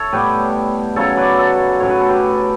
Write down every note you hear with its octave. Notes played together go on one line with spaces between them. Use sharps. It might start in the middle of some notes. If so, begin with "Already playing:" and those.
Already playing: A4 C#5 E5
A2 G3 B3 G4 B4
C#3 F#3 C#4 A4 C#5
B4 D5
A4 C#5
A2 F#3 C#4 C#5
B4
A4
G4 B4